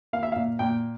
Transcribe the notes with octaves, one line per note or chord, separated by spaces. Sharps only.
A#3 F5
E5
F5
A#2
A#2 G5